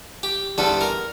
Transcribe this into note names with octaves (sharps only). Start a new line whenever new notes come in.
G4
E2 D3 G3 A4
A#4